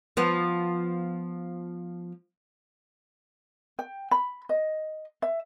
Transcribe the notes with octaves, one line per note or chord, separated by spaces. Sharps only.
F3 B3
G5
B5
D#5
E5